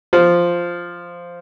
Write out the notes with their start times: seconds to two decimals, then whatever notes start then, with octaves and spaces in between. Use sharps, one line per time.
0.13 F3